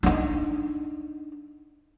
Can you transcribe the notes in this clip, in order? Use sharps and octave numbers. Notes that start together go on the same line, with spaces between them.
D4 D#4